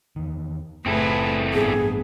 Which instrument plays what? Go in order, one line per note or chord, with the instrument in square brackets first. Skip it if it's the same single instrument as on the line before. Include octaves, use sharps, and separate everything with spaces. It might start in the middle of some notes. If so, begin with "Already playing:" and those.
[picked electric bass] E2 D#3
[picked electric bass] F#1 [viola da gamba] A2 G#4 B4 [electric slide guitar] C4 E4 A4
[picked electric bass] A1 G2 [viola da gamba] B3 [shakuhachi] G#4